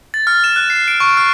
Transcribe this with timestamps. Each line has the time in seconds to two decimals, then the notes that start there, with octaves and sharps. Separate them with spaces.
0.14 A6
0.27 F6
0.44 E7
0.56 F#6
0.70 C7
0.88 D7
1.00 C#6
1.17 F6